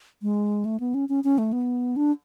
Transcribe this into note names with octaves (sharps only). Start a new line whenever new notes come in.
G#3
A3
B3
C#4
C#4
C#4
A3
B3
D4